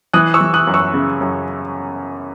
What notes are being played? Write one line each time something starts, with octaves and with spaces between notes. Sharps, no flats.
E3 D#6 F#6
C#6 E6
E3
D#6 F#6
F#2
C#6 E6
C#3
F#2